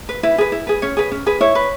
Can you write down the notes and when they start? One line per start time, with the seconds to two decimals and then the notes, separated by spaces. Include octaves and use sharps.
0.09 B4
0.23 E4 B4
0.38 G#4 B4
0.52 E4
0.67 G#4 B4
0.82 C#4 C#5
0.97 G#4 B4
1.11 C#4
1.26 G#4 B4
1.40 E4 C#5
1.55 B4